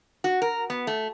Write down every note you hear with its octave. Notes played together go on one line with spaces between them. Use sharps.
F#4
A#4
B3
A3